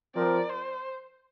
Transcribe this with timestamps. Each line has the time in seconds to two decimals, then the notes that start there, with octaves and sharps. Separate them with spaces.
0.15 F3 C4 A#4 D5
0.49 C5